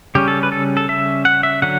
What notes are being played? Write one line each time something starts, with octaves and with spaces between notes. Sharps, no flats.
C#3 G3 C#4 G4
A4
B4
A4
A4
E5
F#5
E5
D3 F#3 F#5